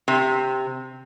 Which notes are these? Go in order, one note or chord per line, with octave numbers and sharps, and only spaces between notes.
C3